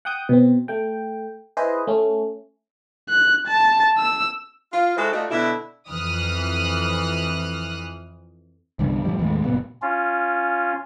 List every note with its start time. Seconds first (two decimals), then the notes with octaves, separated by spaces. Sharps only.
0.05 F#5 G5 D#6 G6
0.29 B2 C4
0.68 A3 G5
1.57 E4 G#4 B4 C5 D#5
1.87 A3 C#4
3.09 F#6
3.47 A5
3.98 E6
4.73 F4
4.97 G#3 E4 F#4 A4 C5
5.12 A3 D#4 F4 F#4 D5
5.30 B2 D3 E4
5.89 F2 E3 D#6 F6 F#6
8.79 C2 G2 D3
9.04 A2 C3 F3 G3
9.19 D#2 A2 G#3
9.44 F#1 A#2 B3
9.82 C#4 F4